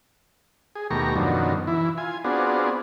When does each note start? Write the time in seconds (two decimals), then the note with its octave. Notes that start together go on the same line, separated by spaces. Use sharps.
0.75 G#4
0.91 D#2 B2 A3 G4 A#5 C#6
1.16 F#2 B2 D3 D#3 F3 F#3
1.67 E3 E4
1.98 F4 G#5
2.24 B3 C4 D4 F4 F#4 G#4